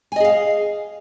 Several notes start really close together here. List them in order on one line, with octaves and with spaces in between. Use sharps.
G#5 D#5 G#4 F5